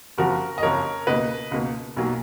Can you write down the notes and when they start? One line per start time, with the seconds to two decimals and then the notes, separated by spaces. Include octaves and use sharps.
0.18 F#1 F2 F3 F#4 A#4
0.58 D#5
0.63 F#1 F2 F3 A#4 C#5
1.07 C#2 B2 A#3 B4 D#5
1.51 C#2 B2 A#3
1.96 B1 B2 F#3 A#3